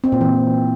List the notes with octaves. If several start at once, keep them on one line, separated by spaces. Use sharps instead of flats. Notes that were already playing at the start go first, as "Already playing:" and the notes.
C4
A#2
E3